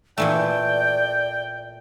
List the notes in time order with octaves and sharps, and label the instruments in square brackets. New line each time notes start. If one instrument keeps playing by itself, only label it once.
[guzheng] A#2 E3 A3 [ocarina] D5 [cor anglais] G5